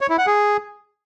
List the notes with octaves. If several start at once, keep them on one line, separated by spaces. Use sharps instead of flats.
C#5
E4
F#5
G#4